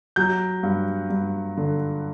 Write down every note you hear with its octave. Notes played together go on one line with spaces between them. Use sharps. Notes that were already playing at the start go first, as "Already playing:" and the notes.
F#3 G6
G2
G2
D3